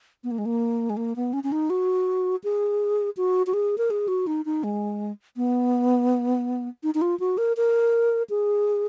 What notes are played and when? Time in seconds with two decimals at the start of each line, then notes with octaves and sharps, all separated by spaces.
0.24 B3
0.31 A#3
0.38 G#3
0.46 A#3
0.90 G#3
0.97 A#3
1.16 B3
1.33 C#4
1.44 C#4
1.52 D#4
1.70 F#4
2.44 G#4
3.17 F#4
3.47 F#4
3.54 G#4
3.78 A#4
3.90 G#4
4.08 F#4
4.27 D#4
4.45 D#4
4.64 G#3
5.36 B3
6.83 D#4
6.95 D#4
7.01 F4
7.20 F#4
7.38 A#4
7.57 A#4
8.30 G#4